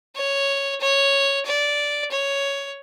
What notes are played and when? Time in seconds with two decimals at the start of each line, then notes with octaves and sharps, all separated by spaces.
0.16 C#5
0.80 C#5
1.45 D5
2.11 C#5